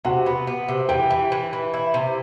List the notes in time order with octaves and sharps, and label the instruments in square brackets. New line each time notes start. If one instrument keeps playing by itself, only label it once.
[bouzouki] C3 [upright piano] F#4 F#5
[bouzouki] B3
B3
C3
[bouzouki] E3 [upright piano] G4 G5
[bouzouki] E3
E3
E3
E4
C3